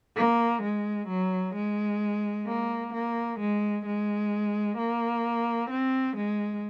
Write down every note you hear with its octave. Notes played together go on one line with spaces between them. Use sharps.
A#3
G#3
F#3
G#3
A#3
A#3
G#3
G#3
A#3
C4
G#3